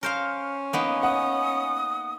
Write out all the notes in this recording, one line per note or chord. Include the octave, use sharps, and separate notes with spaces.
C#4 A#4 C5 F5
A#3 B3 D#4
F#5 D#6